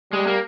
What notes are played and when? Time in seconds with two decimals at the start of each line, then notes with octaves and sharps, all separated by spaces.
0.12 G3 G#3
0.27 A#3